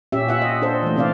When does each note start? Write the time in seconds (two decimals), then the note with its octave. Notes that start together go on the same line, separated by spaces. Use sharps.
0.12 A#2 C#4 G4 E5
0.28 F4 E5 F#5
0.42 D#5
0.62 D4 A4 C5
0.83 E3 A3
0.96 C3 C4 D5 F5